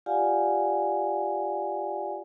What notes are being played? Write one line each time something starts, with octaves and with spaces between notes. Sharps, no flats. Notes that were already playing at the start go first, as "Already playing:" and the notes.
F4 G4 D5 F5 F#5 G#5